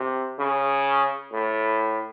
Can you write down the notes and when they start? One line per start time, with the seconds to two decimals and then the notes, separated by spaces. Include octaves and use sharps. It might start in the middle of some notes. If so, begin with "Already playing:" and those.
Already playing: C3
0.39 C#3
1.33 A2